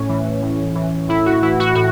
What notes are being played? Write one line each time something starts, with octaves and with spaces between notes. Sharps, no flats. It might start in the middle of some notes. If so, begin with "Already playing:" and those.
Already playing: A2 C#4
E3
A2
E3
A2 E4
F#4
E3 E4
F#4
A2 F#4